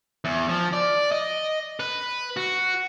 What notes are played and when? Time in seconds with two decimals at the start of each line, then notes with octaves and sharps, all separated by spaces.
0.25 E2
0.49 F3
0.73 D5
1.12 D#5
1.80 B4
2.37 F#4